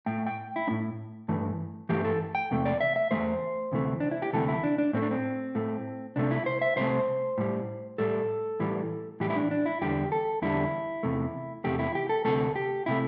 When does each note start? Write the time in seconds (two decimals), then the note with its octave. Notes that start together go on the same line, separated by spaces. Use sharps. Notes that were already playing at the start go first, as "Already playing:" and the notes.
0.06 A2 A3 G5
0.27 G5
0.56 E4
0.67 A3 D4
0.70 A2
1.28 G2 E3 A3
1.89 G2 E3 A3 G4
2.04 A4
2.35 G5
2.51 E2 C3 A3
2.65 D5
2.81 E5
2.96 E5
3.11 E2 C3 A3 C5
3.72 D2 C3 E3 A3
4.00 D4
4.11 E4
4.22 G4
4.33 D2 C3 E3 A3 A4
4.48 E4
4.63 D4
4.78 D4
4.93 A2 A3 C4
5.02 D4
5.11 C4
5.55 A2 A3
6.16 C2 C3 A3 D4
6.31 E4
6.46 C5
6.62 E5
6.77 C2 C3 A3 C5
7.38 A2 G3
7.98 A2 G3 A4
8.60 A2 E3 G3
9.20 A2 E3 G3 G4
9.30 E4
9.36 D4
9.51 D4
9.66 E4
9.81 E2 D3 G3 G4
10.12 A4
10.42 E2 D3 G3 E4
11.03 E2 C3 A3
11.64 E2 C3 A3 G4
11.79 E4
11.95 G4
12.09 A4
12.25 D2 C3 A3 A4
12.56 G4
12.86 C3 A3 E4